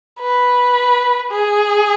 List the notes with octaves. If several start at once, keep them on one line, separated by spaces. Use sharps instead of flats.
B4
G#4